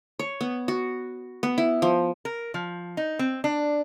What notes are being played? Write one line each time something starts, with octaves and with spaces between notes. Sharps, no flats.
C#5
B3
F#4
B3
E4
F3
A#4
F3
D#4
C4
D4